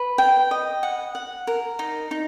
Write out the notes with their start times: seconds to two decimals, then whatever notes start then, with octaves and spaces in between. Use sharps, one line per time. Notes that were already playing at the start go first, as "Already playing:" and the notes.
Already playing: B4
0.18 G5
0.51 D#5
0.83 F#5
1.15 F#5
1.47 A#4
1.79 D#4
2.11 D#4